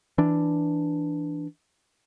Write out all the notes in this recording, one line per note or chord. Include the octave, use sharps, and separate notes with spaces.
E3 D4